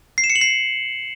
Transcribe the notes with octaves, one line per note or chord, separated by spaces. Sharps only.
C7
E7
C#7
F#7
C7